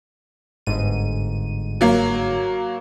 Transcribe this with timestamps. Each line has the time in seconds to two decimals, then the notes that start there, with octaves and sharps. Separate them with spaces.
0.67 G1 G#2 D#7
1.81 F#3 A#3